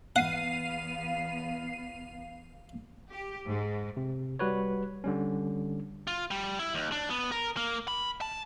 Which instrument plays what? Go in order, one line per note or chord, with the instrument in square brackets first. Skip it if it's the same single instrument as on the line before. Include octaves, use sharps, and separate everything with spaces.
[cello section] E2 B3 [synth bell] F5 C7 D#7 [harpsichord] F#5
[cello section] G4
G#2
[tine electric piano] C3
G3 F#4 B4 C#5
D3 G3 C#4
[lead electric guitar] F4
G3
E4
D#2
D4
B3
A#4
A#3
B5
A5